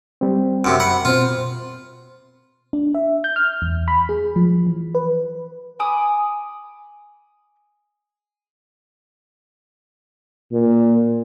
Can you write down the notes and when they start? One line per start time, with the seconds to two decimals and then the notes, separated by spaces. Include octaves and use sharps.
0.21 G3 C4
0.64 F#2 C3
0.80 F#5 B5
1.05 B2 C4 F4 C5
2.73 D4
2.95 E5
3.24 G6
3.36 F6
3.62 E2
3.88 B5
4.09 G#4
4.36 F3
4.67 E3
4.95 B4
5.79 G#5 B5 D6 D#6
10.52 A#2